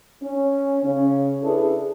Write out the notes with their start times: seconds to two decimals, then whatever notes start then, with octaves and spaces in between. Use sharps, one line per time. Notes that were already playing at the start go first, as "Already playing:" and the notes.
0.22 C#4
0.83 C#3 C#4
1.43 D4 E4 G#4 A4 B4